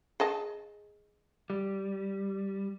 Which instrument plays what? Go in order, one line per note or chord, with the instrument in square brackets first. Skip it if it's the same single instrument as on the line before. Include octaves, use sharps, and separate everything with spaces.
[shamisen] G#4 D#5 A5
[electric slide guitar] G3